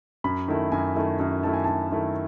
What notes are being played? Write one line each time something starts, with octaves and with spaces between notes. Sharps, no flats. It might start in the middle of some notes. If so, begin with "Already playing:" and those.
F#2 B5
D#3 A3 E4
F#2 G#5
D#3 A3 E4
F#2
D#3 A3 E4 A5
G#5
F#2 A5
D#3 A3 E4